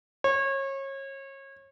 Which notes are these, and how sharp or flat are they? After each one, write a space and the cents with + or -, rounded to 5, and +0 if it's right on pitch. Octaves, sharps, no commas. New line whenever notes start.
C#5 -30